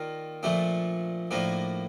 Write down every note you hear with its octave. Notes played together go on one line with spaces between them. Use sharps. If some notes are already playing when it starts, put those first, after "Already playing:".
Already playing: D#3 A#3 F4 A#4 D5
A#2 F3 A3 D4
A2 F3 A#3 D4